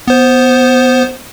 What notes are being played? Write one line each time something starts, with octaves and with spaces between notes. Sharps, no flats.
B3 C5